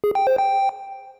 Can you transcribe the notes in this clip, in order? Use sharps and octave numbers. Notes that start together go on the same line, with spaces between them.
G#4
G5
C5
G5